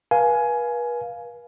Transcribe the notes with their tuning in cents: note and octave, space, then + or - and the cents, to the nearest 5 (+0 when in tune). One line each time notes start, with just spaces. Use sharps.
B4 -40 F5 +0 G#5 +15